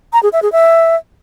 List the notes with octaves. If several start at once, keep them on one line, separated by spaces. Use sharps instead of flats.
A#5
G#4
E5
G#4
E5